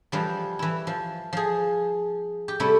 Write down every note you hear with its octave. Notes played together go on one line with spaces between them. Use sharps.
E3 F3 G3
E3 E4
F3
F3 G#4
G4
C3 G3 A3 E4